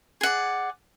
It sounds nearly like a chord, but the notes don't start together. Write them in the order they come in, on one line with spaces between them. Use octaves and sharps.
G#4 F#5 D5